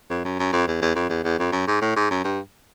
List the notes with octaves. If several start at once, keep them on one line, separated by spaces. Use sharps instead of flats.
F2
F#2
F#2
F2
E2
E2
F2
E2
E2
F2
F#2
G#2
A2
G#2
F#2
G2